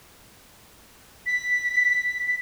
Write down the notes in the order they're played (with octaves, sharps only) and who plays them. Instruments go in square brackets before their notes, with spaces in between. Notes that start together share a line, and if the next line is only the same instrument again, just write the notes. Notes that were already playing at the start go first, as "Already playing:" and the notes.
[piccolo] B6